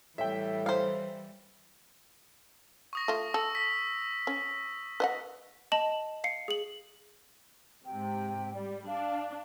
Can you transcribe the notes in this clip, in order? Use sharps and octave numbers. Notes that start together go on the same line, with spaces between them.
A2 E3 G3 E5 G5
C5 F5
C#6 D#6 A#6
A3 F4
A4 E6
B6
C#4
B4 D#5 F#5
D#5 A5 F#7
F5 C7 C#7
G#4 F#7
G#2 C3 G5
G3 D5
D4 F5